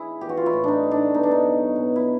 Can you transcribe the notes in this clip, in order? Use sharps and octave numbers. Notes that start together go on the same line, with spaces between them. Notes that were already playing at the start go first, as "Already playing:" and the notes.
Already playing: E4 G#4
E3 G4
F#4
F4
E4
A2
D4 D#4
A2
D4
B2 D#4
D4
D#4
F#3
B2
E4